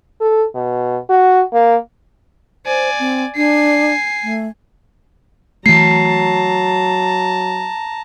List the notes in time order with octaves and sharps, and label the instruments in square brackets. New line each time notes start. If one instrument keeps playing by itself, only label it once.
[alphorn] A4
B2
F#4
A#3
[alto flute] C5 [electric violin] D5 G#5
[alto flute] C4
[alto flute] D4 [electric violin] G#5 C7
[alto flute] A3
[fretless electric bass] E3 A3 [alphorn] F#3 [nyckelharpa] A5 A#5 [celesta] C7